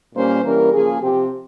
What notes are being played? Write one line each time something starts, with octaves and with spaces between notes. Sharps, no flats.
A#2 G3 A#3 C#4 C5
E3 G3 A#3 C#4 A#4
C#3 F3 A#3 G#4
C3 F3 C4 G4